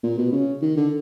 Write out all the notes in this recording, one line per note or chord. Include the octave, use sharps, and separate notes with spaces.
A#2
B2
C#3
D#3
D3